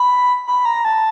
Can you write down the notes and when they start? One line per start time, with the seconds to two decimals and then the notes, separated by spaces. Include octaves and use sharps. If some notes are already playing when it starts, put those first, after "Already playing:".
Already playing: B5
0.47 B5
0.65 A#5
0.85 A5